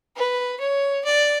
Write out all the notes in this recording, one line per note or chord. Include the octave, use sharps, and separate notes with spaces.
B4
C#5
D5